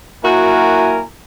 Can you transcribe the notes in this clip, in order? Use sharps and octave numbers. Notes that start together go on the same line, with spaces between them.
F#2 A#3 E4 F#4 A#4 G#5